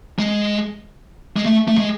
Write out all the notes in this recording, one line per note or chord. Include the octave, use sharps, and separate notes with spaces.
G#3
G#3
A3
A3
G#3